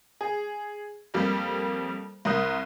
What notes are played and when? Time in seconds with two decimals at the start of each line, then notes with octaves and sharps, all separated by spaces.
0.21 G#4
1.14 F2 G3 A#3
2.25 C2 A#4 D#6 F#6